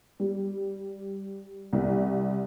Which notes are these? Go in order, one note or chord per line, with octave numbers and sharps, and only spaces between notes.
G3
C2